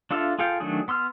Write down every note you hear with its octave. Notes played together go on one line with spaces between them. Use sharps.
D4 F4 A4 E5 F5
F4 G#4 A4 F5 G5
D#3 F#3 A3 D4 G#4
B3 C6 E6 F6